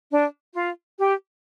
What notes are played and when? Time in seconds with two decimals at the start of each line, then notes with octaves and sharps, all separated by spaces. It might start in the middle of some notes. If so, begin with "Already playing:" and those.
0.11 D4
0.54 F4
0.99 G4